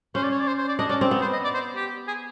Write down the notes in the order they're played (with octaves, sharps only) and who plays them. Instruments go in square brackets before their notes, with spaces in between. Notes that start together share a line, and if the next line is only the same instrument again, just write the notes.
[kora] C#4 [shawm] C5
[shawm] D5
C#5
D5
C5
C5
D5
[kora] D4 [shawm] D#5
[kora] C#4 [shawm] D5
[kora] C4 [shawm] D5
[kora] B3
[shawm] C5
D#5
D5
C5
G4
G#4